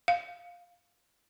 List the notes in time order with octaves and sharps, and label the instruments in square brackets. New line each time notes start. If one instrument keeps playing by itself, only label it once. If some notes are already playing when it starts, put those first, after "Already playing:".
[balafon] F5